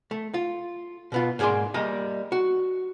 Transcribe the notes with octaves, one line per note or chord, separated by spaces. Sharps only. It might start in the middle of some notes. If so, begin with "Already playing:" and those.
A3
F4
B2 B3 F4
G#2 A#3 G#4 D5 G#5 C6
G3 A#3 D#5
F#4